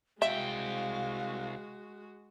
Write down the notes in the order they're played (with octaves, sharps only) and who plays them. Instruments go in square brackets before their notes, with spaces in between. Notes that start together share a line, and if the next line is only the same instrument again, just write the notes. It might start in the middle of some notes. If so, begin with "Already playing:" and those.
[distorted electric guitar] C2 G5 [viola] G#3 F#4 [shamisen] E5 [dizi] F5